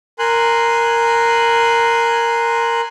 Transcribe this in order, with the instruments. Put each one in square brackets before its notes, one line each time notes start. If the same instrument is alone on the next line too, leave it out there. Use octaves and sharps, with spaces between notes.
[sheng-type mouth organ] A#4 G#5 C6 F#6